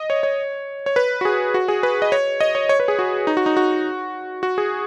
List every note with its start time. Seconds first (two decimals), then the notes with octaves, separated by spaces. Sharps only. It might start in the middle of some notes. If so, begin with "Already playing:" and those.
Already playing: D#5
0.10 C#5
0.23 C#5
0.86 C#5
0.96 B4
1.21 F#4
1.25 G#4
1.54 F#4
1.68 G#4
1.83 B4
2.02 D#5
2.12 C#5
2.40 D#5
2.55 C#5
2.69 C#5
2.80 B4
2.88 G#4
2.99 F#4
3.27 D#4
3.37 F#4
3.46 D#4
3.57 F#4
4.43 F#4
4.58 G#4